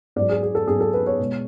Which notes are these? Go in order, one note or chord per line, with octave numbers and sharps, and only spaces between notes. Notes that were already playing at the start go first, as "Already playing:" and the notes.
G#2 F#3 D5
G#4
G#4
A4
G#2 F#3 G#4
A4
B4
C#5
B2 G#3